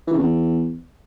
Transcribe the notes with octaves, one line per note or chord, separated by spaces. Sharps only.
E3
C#3
E2